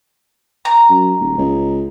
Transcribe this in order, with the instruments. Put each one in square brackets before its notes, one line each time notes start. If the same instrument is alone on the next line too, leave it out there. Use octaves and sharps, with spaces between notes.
[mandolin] A#5
[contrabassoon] F#2
D#1
C#2